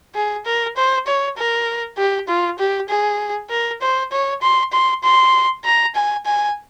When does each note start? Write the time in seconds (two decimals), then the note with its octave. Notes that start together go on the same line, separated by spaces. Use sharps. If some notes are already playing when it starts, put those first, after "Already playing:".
0.15 G#4
0.45 A#4
0.77 C5
1.07 C#5
1.37 A#4
1.98 G4
2.28 F4
2.59 G4
2.89 G#4
3.50 A#4
3.81 C5
4.12 C#5
4.42 C6
4.72 C6
5.03 C6
5.64 A#5
5.95 G#5
6.26 G#5